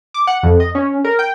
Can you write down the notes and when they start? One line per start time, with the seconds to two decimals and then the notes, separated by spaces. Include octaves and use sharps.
0.14 D6
0.27 F#5
0.43 F2
0.60 D#5
0.75 C#4
1.05 A#4
1.19 G5